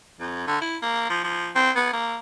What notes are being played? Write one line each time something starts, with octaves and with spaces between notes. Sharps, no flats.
F2
D3
E4
A#3
F3
F3
C4
B3
A#3